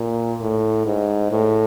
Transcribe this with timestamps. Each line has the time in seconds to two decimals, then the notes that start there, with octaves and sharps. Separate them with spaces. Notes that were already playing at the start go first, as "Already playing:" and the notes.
Already playing: A#2
0.41 A2
0.86 G#2
1.31 A2